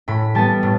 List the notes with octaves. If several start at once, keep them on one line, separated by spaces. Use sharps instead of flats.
A2 B5
G3 B3 A5
A2